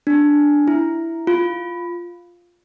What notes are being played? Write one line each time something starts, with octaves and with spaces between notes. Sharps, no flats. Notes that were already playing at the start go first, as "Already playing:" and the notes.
D4
E4
F4